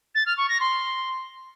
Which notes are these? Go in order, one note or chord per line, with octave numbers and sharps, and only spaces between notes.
A6
F6
C#6
A#6
C6